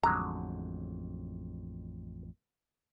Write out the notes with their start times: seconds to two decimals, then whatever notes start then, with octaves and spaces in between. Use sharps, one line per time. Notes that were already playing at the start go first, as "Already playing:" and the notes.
0.03 A1 F2 D3 F#3 G#3 A#5